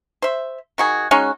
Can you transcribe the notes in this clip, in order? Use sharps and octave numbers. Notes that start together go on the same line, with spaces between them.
C5 E5
D#3 F#4 G#4
G#3 C#4 D#4 F#4